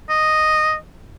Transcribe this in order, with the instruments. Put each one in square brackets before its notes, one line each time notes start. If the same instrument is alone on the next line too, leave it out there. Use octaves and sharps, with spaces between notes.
[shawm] D#5